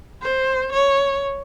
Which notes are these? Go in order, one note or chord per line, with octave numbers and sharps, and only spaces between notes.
C5
C#5